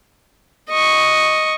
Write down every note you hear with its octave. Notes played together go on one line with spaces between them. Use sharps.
D#5 C#6